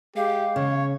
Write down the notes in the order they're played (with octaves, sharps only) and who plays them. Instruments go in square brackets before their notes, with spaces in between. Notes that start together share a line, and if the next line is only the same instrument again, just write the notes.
[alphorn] G#3 [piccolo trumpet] G4 [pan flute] F5
[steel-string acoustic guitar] C#3 [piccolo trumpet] C#5